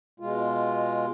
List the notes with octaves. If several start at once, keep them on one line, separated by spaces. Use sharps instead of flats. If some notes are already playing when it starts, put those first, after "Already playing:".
B2 G#3 F4